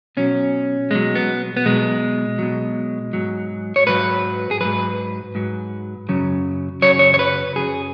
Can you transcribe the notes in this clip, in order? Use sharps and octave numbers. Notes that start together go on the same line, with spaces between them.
B2 F#3 C#4
B2 F#3 G#3
B3
B3
B2 F#3 G#3
B2 F#3
G#2 F#3
C#5
G#2 F#3 B4
G#4
G#2 F#3 B4
G#2 F#3
F#2 C#3 F#3
F#2 C#3 F#3 C#5
C#5
C#5
B4
F#2 C#3 F#3 G#4